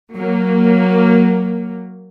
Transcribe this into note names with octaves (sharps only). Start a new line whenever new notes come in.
F#3 A#3